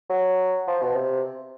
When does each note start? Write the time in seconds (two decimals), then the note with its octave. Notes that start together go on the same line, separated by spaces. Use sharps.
0.10 F#3
0.67 F3
0.82 B2
0.96 C3